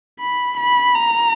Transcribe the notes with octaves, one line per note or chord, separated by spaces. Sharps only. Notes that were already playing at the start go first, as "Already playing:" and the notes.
B5
B5
A#5